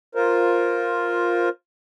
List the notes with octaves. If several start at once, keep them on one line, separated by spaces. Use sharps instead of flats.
F4 A#4 C5